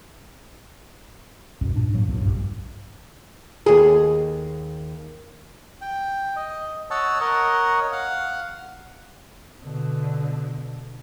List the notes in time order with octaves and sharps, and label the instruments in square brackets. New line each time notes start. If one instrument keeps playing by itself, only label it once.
[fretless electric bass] C2 F#2 B2
G2 A#2 D4
A2 F#3 G#3 A#3
C2 G2 A#2
F1 A#1 G2
[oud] D#2 G#4
[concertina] G5
D#5
C#5 D#5 F#5 A5 E6
A#4 C#5 D#5 F#5
F5 F#5
[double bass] B2 D3